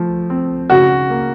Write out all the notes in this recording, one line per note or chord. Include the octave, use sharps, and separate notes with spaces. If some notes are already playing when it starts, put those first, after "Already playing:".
Already playing: F3 A3
C4
C#3 F#4
A#3